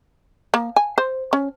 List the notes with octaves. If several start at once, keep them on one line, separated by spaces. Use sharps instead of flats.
A#3
G#5
C5
C#4